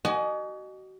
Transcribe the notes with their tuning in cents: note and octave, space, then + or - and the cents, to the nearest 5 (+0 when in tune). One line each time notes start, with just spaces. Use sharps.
F#4 +35 D#5 -25 G#5 +25